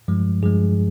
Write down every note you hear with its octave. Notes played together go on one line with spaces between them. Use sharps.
G2 F3 G#3
G2 F3 G#3 G#4